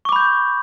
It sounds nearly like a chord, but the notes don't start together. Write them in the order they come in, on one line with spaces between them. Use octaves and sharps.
C#6 D6 B5 G6